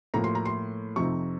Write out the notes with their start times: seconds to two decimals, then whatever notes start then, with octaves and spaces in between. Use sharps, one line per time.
0.14 A2 F3 A#3 A#5
0.24 C6
0.35 A#5
0.45 C6
0.96 F2 C3 F3 C4 D#4 C#6